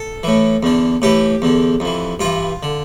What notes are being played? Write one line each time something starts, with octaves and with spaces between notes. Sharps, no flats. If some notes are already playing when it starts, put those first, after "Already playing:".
Already playing: A4
A2 E3
E2 D3
A2 E3 G4
E2 D3
F2 E3
G2 E3 F4
D3